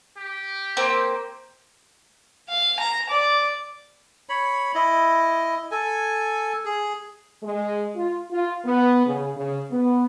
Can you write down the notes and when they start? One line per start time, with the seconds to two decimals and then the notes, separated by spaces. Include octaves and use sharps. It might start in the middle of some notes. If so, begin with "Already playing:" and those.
0.18 G4
0.77 A#3 C4
2.49 F5
2.80 A#5
3.10 D5
4.29 C#5 B5
4.75 E4 D#5
5.71 A4 G#5
6.65 G#4
7.43 G#3
7.95 F4
8.31 F4
8.65 B3
9.06 C#3
9.36 C#3
9.71 B3